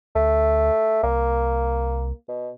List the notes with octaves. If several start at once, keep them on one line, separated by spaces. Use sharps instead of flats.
D2 A3
C2 A#3
B2